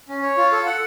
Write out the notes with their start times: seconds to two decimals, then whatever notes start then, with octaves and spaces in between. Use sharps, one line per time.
0.09 C#4
0.23 C#5
0.37 F4
0.52 A4
0.66 F#5